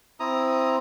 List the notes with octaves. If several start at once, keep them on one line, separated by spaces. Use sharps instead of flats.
C4 E4 A#5 D#6